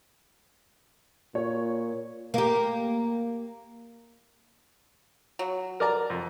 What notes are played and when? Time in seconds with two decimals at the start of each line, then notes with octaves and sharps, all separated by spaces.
1.35 A#2 C#5
2.34 A#3 G4
5.39 F#3
5.80 A#4 D5 A#5
6.10 F2